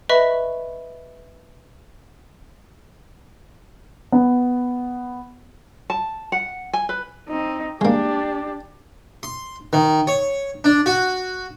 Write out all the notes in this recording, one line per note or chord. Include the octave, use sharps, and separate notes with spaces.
B4 D#5 E5 B5 C#6 B6
B3
A5
F#5
G#5
B4
C4 D#4
G#3 A#3 D4 G4
C6
D#3
C#5
D4
F#4